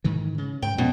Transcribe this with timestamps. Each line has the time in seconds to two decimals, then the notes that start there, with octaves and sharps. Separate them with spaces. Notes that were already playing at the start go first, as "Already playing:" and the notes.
0.04 G#2 D#3 E3
0.38 C#3
0.62 G#2 G5
0.78 F2 B2 G#3 C#4